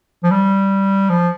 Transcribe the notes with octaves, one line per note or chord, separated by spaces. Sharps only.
F3
G3
F3